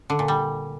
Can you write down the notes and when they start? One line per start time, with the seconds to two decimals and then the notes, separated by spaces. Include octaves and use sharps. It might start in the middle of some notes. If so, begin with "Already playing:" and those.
0.10 D3
0.19 A#2
0.28 G3